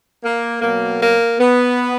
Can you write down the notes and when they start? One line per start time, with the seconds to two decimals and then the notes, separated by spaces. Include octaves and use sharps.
0.24 A#3
0.62 B2 F#3 A#3
1.01 A#3
1.39 B3